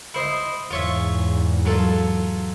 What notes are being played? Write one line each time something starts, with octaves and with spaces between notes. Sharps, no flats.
E4 C5 D#5
E2 G#2 F4 C#5 E5
F#3 F4 A4